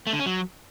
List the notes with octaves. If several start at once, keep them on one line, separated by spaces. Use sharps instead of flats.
A3
D3
C#4
F#3